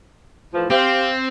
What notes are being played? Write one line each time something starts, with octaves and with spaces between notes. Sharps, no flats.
A2 E3 F3
C4 G4 C5 F5